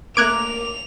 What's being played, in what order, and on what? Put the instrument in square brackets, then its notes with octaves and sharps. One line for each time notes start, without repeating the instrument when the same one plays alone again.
[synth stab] A3 A#3 A#4 [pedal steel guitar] D6 [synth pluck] F#6 G#6 D7 [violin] F7